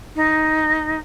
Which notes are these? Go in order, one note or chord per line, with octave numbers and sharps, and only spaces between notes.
D#4